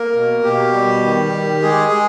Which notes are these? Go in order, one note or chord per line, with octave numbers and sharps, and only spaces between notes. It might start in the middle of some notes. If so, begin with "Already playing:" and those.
Already playing: A#3 A#4
B2
B2 G4
G3
D#3
D#3
G#3 G#4
G#3